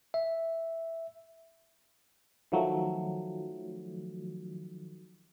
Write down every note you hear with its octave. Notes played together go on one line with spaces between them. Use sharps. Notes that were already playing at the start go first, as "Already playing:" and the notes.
E5
D#3 F3 F#3 A3